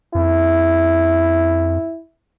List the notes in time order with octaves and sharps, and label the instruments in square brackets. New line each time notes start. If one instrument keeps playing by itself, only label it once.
[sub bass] F2 [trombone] E4